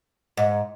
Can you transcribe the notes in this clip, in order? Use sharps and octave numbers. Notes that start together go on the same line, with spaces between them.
G#2